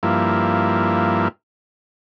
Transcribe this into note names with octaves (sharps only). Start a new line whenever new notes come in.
G2 F3 A#3 E4